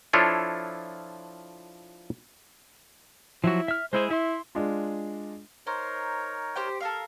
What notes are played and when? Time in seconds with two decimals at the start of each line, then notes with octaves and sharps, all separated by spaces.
0.13 F3 D4 E4 F4 A4 C#5
3.44 F3 F#3 E4 F#4
3.68 E5 F6
3.93 G#3 E4 G#4 C5
4.10 E4 E5 C6
4.55 G#3 D4 F4
5.67 D#4 A#4 C5 C#5
6.56 G4 C5 G5
6.80 A4 A#4 F5